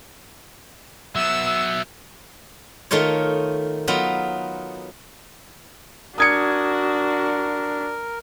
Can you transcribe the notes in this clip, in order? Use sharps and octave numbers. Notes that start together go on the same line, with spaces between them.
F#3 B3 E5 E6
D#3 A3 D#4 F4 C#5
F#3 B3 D#4 F4
D4 F#4 A#4 D#6 G#6 C#7